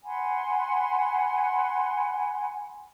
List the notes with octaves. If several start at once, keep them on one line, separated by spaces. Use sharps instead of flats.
F#5 G#5 B5 C6